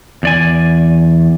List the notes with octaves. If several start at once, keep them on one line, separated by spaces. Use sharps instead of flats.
E2 D5 G#5